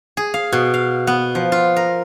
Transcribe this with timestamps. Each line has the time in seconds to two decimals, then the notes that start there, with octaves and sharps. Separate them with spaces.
0.17 G#4
0.34 F5
0.52 B2
0.74 F5
1.07 B3
1.35 F3
1.52 F4
1.76 A#4